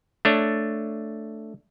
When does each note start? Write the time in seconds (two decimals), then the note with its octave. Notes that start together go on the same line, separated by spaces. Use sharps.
0.25 A3 D4 C#5